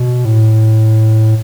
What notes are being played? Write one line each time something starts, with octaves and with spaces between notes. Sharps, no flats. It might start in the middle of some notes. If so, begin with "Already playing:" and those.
Already playing: B2
A2